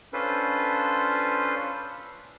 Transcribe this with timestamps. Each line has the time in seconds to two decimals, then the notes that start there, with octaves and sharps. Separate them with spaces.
0.13 C#4 D4 F4 A4 B4 C5